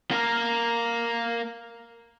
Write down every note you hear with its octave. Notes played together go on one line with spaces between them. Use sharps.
A#3 A#4